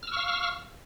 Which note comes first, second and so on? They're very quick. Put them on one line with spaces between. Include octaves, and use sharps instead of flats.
F6 E6 C#6 F5